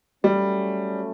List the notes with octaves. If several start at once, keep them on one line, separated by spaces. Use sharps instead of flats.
F#3 G3 A3 C#4